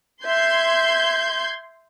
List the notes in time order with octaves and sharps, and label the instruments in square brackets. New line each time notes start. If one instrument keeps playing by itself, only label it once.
[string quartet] E5 [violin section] C6 G6 G#6